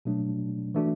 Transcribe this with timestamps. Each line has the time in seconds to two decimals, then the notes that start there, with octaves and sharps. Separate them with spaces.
0.05 B2 F#3 A3 D4
0.75 E3 A3 D4 F#4